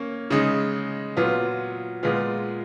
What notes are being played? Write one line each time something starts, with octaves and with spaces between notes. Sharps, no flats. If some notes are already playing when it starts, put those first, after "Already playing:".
Already playing: A#3 C#4
C#3 G#3 D#4
A#2 F#3 B3 F4
A#2 G#3 B3 F4